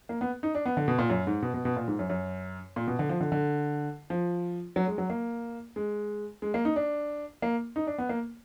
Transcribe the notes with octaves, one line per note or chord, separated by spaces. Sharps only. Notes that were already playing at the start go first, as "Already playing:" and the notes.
A#3
B3
D#4
D4
B3
D3
B2
A#2
F#2
G#2
B2
B2
B2
A#2
G#2
F#2
F#2
A#2
B2
D3
F3
D3
D3
F3
F#3
G#3
F#3
A#3
G#3
G#3
A#3
D#4
D4
A#3
D#4
D4
B3
A#3